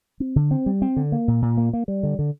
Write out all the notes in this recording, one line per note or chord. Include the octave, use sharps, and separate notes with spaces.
C4
D3
C4
G3
C4
D3
A#3
A#2
A#2
A#3
A#3
G3
D3
D3